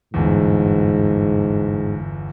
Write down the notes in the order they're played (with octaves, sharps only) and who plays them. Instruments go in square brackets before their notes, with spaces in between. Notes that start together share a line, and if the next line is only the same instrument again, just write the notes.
[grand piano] G1 E2 [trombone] G#2